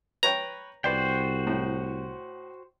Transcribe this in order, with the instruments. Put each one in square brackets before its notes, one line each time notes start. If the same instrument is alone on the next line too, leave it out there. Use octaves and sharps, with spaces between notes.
[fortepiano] B4 C#5 G5 [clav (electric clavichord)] A#5
[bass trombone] C2 [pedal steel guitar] F#4 C5 G5 [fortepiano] B4 D5
[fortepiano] A2